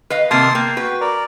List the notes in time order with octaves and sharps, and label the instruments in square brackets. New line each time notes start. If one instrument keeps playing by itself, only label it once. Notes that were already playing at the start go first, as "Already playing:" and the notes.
[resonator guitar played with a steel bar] B4 D#5 F5
[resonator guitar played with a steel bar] C3 D#3 A#3 [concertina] A5 C6 D#6
[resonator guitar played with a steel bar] A#3 [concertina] G5
[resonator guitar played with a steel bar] F#4 B4
[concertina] A#4 D5